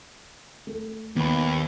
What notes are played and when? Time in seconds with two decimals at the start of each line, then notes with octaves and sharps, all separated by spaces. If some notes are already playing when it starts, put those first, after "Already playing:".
0.67 A3
1.16 D#2 B3 B5